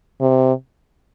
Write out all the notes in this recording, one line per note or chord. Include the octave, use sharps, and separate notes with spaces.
C3